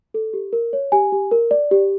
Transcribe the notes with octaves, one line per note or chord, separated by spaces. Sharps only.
A4
G4
A#4
C#5
G4 G#5
G4
A#4
D5
G4